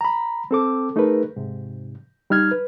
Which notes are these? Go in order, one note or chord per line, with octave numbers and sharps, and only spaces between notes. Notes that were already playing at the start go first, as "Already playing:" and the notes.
A#5 B5
C4 A4 D6
A3 D#4 G#4 A#4 B4
G#2 C3
G3 D#4 F6 G#6
B4